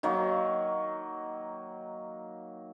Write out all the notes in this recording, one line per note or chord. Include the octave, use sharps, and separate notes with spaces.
D#3 F#3 A#3